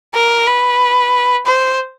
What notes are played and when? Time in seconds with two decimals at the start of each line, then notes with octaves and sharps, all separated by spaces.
0.14 A#4
0.47 B4
1.46 C5